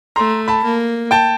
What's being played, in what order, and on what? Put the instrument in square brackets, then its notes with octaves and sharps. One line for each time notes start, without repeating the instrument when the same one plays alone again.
[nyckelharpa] A3 [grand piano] A#5 C6
[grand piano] A5 B5
[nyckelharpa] A#3
[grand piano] G5 A5